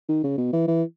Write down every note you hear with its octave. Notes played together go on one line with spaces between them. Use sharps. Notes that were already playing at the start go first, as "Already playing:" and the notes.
D#3
C#3
B2
E3
E3